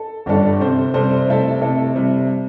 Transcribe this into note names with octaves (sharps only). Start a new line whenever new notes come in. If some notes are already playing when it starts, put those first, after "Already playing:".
Already playing: A4
G1 G2 G3 D4 A4
C3 G3 C4 A4 C5
C3 G3 C4 A4 C5
C3 A3 E4 A4
C3 A3 E4 A4
C3 G3